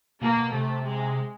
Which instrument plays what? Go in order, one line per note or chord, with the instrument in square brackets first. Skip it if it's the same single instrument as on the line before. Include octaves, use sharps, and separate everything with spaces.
[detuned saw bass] B2 [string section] A#3
[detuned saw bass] B2
[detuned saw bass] C3 [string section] A3
[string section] G#3